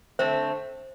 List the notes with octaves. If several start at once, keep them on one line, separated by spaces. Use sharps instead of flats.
D3 A3 C4 C5